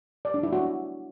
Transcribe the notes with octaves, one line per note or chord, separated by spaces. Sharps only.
D5
D4
E4
F#4
D4